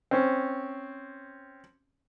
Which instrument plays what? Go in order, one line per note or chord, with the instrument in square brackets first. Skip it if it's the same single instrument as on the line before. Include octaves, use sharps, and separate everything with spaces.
[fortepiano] C4 C#4